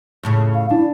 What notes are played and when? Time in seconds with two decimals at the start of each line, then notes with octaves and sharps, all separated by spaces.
0.23 F2 A2 C#3
0.54 F5
0.70 D4 E4